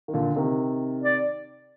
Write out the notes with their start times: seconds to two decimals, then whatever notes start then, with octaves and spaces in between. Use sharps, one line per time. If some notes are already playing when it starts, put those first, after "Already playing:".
0.08 D#3
0.13 A#2 D3
0.36 C3 D#3
1.03 D5